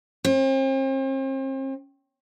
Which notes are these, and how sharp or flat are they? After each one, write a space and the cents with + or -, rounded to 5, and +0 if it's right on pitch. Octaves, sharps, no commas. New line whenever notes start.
C4 +40